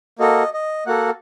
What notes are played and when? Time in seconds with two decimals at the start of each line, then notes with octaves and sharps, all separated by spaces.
0.19 A#3 F#4 A4 D#5
0.53 D#5
0.86 A#3 F#4 A4 F#5